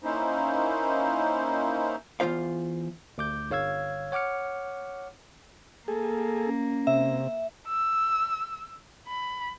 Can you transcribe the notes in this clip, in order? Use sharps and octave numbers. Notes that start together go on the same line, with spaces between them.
A#3 C#4 D#4 E4 C5
E2 D#3 F4 C5 F5
D2 D6 G6
G1 C#5 F5 E6 G#6
C#5 F#5 D6 F6 C#7
A#3 G#4 A4
C#4
C3 E5
E6
B5